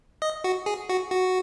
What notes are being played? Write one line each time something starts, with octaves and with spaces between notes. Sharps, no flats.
D#5
F#4
G#4
F#4
F#4